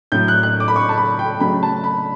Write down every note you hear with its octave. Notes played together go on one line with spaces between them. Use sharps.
A2 F#3 A3 G6
F#6
F#6
D6
B5
C#6
A5
B5
G5
C#3 F#3 A3 B5
A5
B5